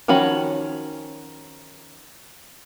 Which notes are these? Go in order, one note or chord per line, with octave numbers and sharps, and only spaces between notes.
D#3 F3 C#4 F#4 B5